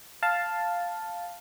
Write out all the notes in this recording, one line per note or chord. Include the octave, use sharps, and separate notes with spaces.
F5 A5